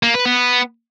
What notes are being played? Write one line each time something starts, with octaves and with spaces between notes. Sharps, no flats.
A#3
B4
B3